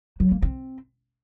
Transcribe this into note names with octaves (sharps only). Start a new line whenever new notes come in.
F#3
A#3
C4